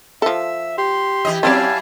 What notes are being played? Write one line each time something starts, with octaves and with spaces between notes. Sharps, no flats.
F3 A4 E5
G4 C6
E3 D#5
F#3 C4 C#4 E4 D5 F5 G#5 A5